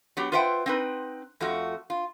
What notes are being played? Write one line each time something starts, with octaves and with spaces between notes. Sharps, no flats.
F#3 B3 G4
F4 B4 C5 E5 F#5 G5
C4 D#4 B4
F2 A3 F4 F#4
F4